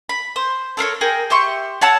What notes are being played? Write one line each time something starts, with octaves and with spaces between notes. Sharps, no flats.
B5
C5
A4 A#4 C5 C#5
G#4 A#4 G5
G4 E5 C6 C#6
C#5 F#5 A5 E6